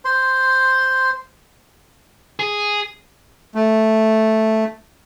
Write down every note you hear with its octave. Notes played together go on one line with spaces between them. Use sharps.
C5 C6
G#4
A3